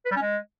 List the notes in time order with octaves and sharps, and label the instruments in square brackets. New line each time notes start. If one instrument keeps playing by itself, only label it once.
[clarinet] B4
G3
C#4
G#3